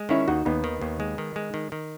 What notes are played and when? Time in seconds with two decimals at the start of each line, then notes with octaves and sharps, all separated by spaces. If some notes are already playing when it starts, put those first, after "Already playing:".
Already playing: G#3
0.09 D#3 C#4 E4
0.27 D#2 D#4 F#4
0.45 D#2 B3 D#4
0.64 D#3
0.81 D#2
1.00 G#3
1.18 D#3
1.36 G#3
1.54 D#3
1.72 D#3